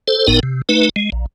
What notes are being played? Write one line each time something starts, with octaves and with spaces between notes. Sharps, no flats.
A4 C5
G1 A2 B3 D#4 A#4
C3
A3 D#4 B4
G#3
A#1